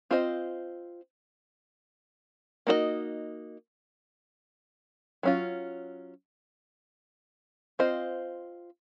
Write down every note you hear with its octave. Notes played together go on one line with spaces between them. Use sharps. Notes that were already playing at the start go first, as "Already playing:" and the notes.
C4 F4 C5 D#5
A#3 D#4 F#4 C5 D#5
F#3 C#4 F4
C4 F4 C5 D#5